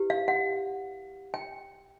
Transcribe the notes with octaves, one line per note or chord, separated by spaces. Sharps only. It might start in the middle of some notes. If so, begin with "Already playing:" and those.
Already playing: E4 G4 B4
F5
F#5
G5